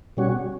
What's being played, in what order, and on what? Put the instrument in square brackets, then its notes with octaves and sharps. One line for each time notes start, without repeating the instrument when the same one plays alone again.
[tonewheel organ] B2 G3 C#4 F#4